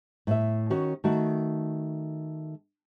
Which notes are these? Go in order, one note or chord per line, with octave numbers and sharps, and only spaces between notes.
A2 E5
D#3 C#4 F#4
D#3 A3 F#4